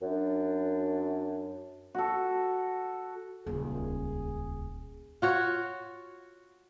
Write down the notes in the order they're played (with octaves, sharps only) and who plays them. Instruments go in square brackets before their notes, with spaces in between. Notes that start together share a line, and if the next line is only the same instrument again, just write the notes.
[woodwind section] F#2 D4
[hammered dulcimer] F#4 A4
[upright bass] D#1 C#2 [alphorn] G#4
[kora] F4 F#4 C#5